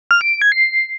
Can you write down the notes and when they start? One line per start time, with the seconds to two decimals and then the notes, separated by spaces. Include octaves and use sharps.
0.11 F6
0.21 D7
0.31 D7
0.42 G#6
0.52 C7